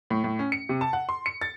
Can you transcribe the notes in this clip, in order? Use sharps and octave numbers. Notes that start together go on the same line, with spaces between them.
A2
A2
C#4
C#7
C3
A5
F#5
C6
C#7
A6